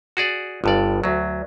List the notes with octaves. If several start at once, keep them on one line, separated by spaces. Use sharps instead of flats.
F#4 G#4 D5
G1 G2 D5
D2 F#3